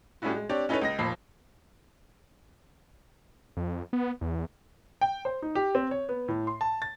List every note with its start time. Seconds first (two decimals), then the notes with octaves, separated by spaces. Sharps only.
0.22 A2 G3 C#4 D4 E4 F#4
0.35 G#3
0.49 C4 D4 G4 C#5 D5
0.69 C#4 D#4 E4 A4 B4 C#5
0.82 C#2 D#5 A#6
0.99 F1 A#2 F3 B5 C7
3.57 F2
3.93 B3
4.21 E2
5.01 G5
5.25 C5
5.42 D#4
5.55 G4
5.75 C4
5.91 C#5
6.09 B3
6.28 A2
6.47 C6
6.61 A5
6.82 A6